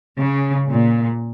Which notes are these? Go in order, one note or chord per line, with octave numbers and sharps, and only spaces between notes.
C#3
A#2